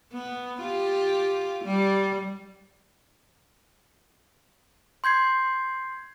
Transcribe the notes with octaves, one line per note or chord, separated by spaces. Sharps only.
B3
F4 G4
G3
C6 G6 G#6 C7